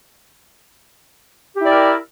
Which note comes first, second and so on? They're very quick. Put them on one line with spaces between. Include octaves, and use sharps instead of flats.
G4 E4 D5 A#4